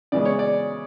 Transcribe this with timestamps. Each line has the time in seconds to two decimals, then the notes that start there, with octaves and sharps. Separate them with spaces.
0.12 C#3 E3 G#3 B3 D5
0.25 C#5
0.39 D5